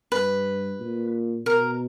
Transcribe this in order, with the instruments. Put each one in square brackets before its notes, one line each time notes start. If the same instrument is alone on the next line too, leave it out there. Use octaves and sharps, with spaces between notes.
[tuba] G2 [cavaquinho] B4
[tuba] A#2
[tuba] B2 [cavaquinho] A#4